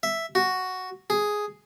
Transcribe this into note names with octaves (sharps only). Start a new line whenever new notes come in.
E5
F#4
G#4